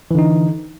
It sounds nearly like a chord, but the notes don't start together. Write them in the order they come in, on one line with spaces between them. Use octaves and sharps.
E3 D3 D#4